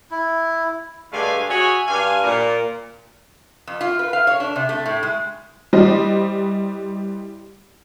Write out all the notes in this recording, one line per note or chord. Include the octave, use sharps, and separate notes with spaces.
E4
G2 D3 G#3 A3 F5 G#5
F#4 G#4 C#5 E5 G#5
G2 F5 G#5
A#2 A#4
F2
F4
B4
F5
C#5
D4
C3
A3
A2
G#3
E3 G3 C5 D#5